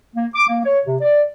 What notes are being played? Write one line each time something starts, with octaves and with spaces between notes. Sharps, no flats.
A#3
D6
A#3
C#5
C3
D5